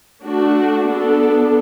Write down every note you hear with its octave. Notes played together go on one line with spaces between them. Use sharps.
A3 D4 F#4
B3 D4 A4